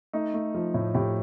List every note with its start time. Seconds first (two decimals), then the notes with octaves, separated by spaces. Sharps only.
0.13 A3 D#4
0.34 A3
0.55 F3
0.74 A2
0.95 A2 G4